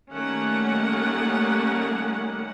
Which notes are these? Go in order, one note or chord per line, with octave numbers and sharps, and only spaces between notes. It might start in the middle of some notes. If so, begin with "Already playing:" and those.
D#3 G3 A3 A#3 C#4 F#5